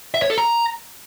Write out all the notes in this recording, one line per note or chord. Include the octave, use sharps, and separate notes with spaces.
E5
C#5
A4
A#5